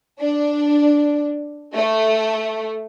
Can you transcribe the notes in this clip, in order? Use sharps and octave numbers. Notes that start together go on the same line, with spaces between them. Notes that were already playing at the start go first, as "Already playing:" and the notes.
D4
A3